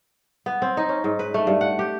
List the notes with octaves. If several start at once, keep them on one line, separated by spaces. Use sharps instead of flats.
B3
C4
D#4
C#4
G#2
B4
A3
G2
F#5
G4